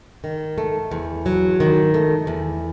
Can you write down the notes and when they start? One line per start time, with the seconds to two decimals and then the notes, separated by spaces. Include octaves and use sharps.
0.24 D#3
0.58 A3
0.91 E2
1.26 F#3
1.60 D#3
1.94 A3
2.27 E2